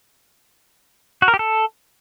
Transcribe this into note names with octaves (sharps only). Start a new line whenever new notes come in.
F#4
A#4
G4
A4